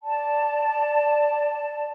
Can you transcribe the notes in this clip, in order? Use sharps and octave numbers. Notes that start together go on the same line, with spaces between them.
D5 A5